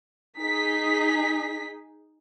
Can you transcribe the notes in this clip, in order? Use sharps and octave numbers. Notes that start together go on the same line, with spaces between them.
D#4 G#4 B6